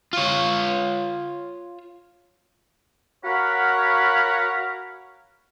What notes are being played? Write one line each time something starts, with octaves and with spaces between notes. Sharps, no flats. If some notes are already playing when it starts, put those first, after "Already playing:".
F4 C#5
F#4 A#4 C#5 F5 F#5 B5